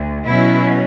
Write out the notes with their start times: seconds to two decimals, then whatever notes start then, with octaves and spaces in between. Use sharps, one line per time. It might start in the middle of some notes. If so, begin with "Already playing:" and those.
Already playing: D2
0.25 B2 F#3 C#4 E4